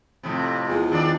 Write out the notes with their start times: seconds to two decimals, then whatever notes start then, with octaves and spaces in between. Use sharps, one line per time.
0.23 F2 A2 C3
0.67 E2 F3 G#3
0.91 D#3 D4 D5